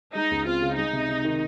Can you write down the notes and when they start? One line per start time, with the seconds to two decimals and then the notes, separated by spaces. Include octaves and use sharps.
0.15 G#3 D#4
0.31 C#2
0.46 C4 F4
0.62 C#3
0.77 G#3 D#4
0.93 C3
1.09 C3
1.25 D#3